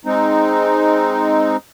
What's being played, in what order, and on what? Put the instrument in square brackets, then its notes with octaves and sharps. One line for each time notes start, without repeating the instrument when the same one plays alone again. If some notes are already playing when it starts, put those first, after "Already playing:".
[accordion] G#3 C4 D#4